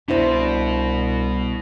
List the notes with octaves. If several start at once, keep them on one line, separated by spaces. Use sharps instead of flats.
C2 B2 D4 E4 C5